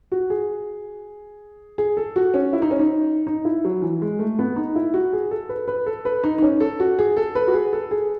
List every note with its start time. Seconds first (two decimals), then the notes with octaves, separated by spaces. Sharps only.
0.12 F#4
0.30 G#4
1.78 G#4
1.97 A4
2.16 F#4
2.34 C#4
2.53 E4
2.62 D#4
2.71 C#4
2.79 D#4
3.27 D#4
3.45 E4
3.64 F#3
3.82 E3
4.02 G#3
4.19 A3
4.39 B3
4.56 D#4
4.76 E4
4.94 F#4
5.13 G#4
5.31 A4
5.49 B4
5.68 B4
5.86 A4
6.05 B4
6.24 D#4
6.38 D#4
6.42 C#4
6.60 A4
6.80 F#4
6.99 G#4
7.17 A4
7.35 B4
7.48 F#4
7.54 G#4
7.73 A4
7.91 G#4